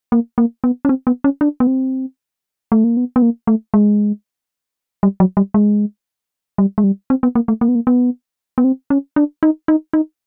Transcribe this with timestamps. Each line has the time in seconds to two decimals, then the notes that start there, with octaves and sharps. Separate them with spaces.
0.12 A#3
0.38 A#3
0.64 B3
0.85 C#4
0.89 C4
1.07 B3
1.24 C#4
1.41 D4
1.60 B3
1.67 C4
2.72 A3
2.84 A#3
2.97 B3
3.16 B3
3.22 A#3
3.47 A3
3.74 G#3
5.03 G3
5.20 F#3
5.37 G3
5.54 G#3
6.58 G3
6.78 G#3
6.84 G3
7.10 C4
7.23 B3
7.35 A#3
7.48 A3
7.61 A#3
7.68 B3
7.75 A#3
7.87 B3
8.58 B3
8.64 C4
8.90 C#4
9.16 D4
9.43 D#4
9.68 D#4
9.93 D#4